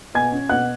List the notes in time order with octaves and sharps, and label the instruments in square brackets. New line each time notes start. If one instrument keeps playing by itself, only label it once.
[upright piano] B2 G#5 G#6
C#4
B2 F#5 F#6